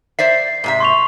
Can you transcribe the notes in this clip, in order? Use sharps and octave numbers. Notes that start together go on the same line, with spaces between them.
C5 D5 E5 C7
G#2 C3 E5
C6 C#6 F7